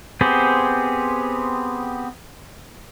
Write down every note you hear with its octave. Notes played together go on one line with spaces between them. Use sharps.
B3 C4 G4 G#4 C5